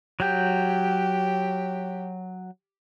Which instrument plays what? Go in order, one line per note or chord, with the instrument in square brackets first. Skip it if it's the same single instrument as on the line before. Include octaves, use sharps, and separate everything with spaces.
[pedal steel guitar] F#3 G6 [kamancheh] G4